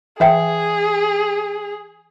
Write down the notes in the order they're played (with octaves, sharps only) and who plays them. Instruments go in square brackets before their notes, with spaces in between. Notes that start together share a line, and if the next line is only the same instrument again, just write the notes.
[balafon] E3 E5 G5 [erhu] G#4